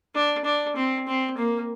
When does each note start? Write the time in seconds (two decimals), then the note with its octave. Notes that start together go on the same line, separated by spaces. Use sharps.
0.15 D4
0.45 D4
0.76 C4
1.07 C4
1.37 A#3